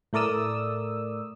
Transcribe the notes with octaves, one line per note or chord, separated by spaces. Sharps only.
A2 A3 A#4 D5 D#6 E6